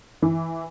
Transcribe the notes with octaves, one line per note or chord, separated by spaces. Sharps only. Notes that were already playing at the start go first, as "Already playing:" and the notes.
E3